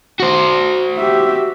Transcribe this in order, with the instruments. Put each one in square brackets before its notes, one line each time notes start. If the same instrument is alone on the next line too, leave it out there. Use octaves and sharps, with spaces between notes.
[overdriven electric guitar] F#4 C5
[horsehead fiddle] G4 E5